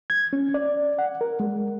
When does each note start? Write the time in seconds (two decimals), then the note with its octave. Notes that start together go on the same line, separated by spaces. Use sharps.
0.10 G#6
0.33 C#4
0.54 D5
0.99 F#5
1.21 A#4
1.40 G#3